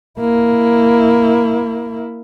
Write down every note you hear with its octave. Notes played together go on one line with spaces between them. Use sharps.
A#3 E4